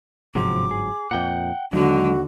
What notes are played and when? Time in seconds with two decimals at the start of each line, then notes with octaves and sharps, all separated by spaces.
0.35 G1 G#2 C3 F3 F#3 D6
0.71 G#4
1.11 F2 A#2 F#5 G5
1.73 D#2 D3 F#3 G#3 F#4